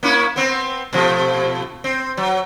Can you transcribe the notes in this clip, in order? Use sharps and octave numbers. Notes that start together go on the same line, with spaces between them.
A#3 C#4 E4
B3 C4
B2 F3 A3
C4
F#3